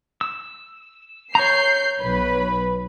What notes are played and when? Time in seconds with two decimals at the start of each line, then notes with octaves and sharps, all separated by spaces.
0.21 E6
1.35 C#5 A#5 G6 C7
2.01 B1 B4 B5